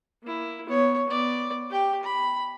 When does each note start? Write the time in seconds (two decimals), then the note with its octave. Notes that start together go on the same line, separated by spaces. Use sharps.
0.23 A#3 E4
0.66 B3 C#5
1.07 B3 D5
1.70 G4 G5
2.03 B5